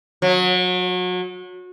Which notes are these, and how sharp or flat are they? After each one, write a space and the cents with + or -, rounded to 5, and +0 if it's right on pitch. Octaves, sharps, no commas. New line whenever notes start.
F#3 -30